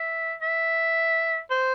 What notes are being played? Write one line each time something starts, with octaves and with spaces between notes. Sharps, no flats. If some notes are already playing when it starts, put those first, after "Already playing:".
Already playing: E5
E5
C5